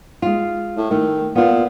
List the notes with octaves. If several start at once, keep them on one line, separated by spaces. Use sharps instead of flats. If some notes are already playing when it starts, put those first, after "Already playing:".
G#3 F4
A2
D#3 A3
A#2 B3 F4